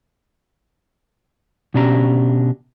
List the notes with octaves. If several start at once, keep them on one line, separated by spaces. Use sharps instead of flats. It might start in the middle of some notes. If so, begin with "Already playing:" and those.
B2 C#4 D4 G4 B4 A#5